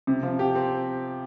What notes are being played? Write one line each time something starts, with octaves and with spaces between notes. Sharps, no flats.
C3
F3
G4
C4